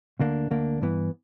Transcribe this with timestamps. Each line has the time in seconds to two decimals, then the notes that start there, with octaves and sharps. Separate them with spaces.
0.19 D2 D3 A#3 D4
0.51 D2 D3 A#3 D4
0.81 G2 E3 B3